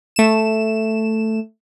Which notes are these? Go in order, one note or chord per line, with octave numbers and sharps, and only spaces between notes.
A3 E7